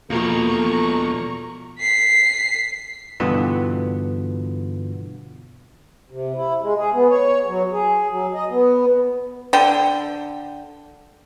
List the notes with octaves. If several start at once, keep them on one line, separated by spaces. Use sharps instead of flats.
E2 B2 F3 A#3 A4 A#5 C#6
B6 C7
G2 B2 D3 E3 B3 F4
C3
E4
G#3
G#4
B3
C#5
F#3
G#4
F#3
D#5
B3
D3 G5